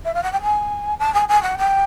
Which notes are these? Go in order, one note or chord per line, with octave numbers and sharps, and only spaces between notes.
E5
F5
F#5
G5
G#5
A5
G#5
G#5
F#5
G5